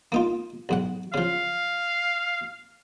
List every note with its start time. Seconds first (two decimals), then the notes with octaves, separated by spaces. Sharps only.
0.12 A#3 D#4 F4
0.69 B1 G#2 F#5
1.14 C#3 F3 F5